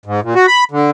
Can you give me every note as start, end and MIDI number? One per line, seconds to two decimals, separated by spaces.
0.06 0.20 44
0.23 0.34 46
0.35 0.46 66
0.47 0.64 83
0.71 0.90 50